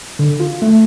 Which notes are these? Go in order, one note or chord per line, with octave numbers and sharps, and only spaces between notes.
D3
F4
A3